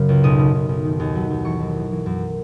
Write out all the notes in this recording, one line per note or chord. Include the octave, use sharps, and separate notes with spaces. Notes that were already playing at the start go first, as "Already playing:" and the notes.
Already playing: F#2 C#3 F#3
C#2
B1 D#6
B2
B1
B1
D#3
D#2
F#3
D#2
E3 C#6
F#2
E3
E3
F#2